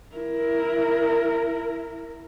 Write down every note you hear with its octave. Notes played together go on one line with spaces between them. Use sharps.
E4 A#4